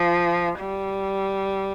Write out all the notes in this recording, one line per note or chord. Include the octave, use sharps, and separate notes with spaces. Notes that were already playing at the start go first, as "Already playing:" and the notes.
Already playing: F3
G3